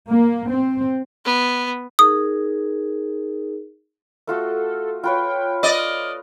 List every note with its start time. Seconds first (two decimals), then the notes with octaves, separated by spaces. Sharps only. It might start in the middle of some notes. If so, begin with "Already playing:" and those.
0.10 A#3
0.51 C4
1.25 B3
1.99 D#4 G#4 A#4 D#6
4.27 A3 F4 F#4 A4
5.04 F4 B4 C#5 G5
5.63 D5 D#5
5.78 F6